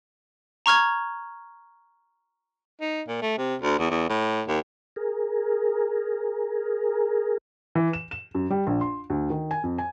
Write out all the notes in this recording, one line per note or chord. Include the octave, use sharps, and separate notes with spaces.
A#5 C#6 F6 G#6
D#4
A#2
A3
C3
D2
E2
E2
A2
D#2
G#4 A#4
E3
E7
E7
F#2
G3
A#1
C6
D2
D#3
G#5
F2
G#5